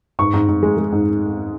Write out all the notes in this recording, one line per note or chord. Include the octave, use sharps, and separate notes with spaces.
G#2 C#6
G#2
G#2
G#3
G#3
G#2